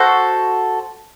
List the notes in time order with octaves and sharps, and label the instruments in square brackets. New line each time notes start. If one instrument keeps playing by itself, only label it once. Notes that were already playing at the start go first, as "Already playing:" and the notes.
Already playing: [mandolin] F#4 A4 C5